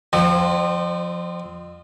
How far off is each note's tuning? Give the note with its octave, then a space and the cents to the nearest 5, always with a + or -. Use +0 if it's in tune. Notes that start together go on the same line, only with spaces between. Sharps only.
F3 +5 C4 -25 D#5 -45